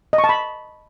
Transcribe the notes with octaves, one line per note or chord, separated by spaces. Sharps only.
D#5
C#6
A5
B5